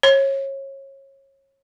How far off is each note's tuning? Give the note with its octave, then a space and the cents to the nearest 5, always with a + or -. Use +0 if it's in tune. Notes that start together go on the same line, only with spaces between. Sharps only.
C#5 -25